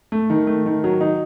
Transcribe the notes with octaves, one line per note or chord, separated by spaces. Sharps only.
A3
D#3
A3
D#3
F#3
D#4